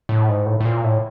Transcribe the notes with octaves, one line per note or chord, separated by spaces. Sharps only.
A2
G#2
A2
A2
A#2
A2